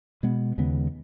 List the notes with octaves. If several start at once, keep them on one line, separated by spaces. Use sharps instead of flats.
B2 G#3 B3
D#2 C#3 G#3 B3